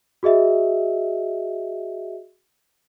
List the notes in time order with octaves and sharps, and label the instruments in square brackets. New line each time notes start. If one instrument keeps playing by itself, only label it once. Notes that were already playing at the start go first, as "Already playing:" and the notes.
[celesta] F#4 G#4 D#5 E5